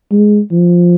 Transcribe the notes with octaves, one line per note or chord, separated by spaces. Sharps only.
G#3
F3